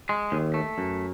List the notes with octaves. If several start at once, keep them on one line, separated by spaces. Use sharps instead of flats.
G#3
D#2
A3
F#2